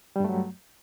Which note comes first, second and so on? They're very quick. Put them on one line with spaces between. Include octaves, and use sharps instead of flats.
G3 G2 A3 F#3